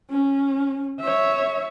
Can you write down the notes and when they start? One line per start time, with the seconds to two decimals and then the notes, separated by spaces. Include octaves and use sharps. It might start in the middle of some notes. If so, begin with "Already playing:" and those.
0.10 C#4
1.00 C#5 E5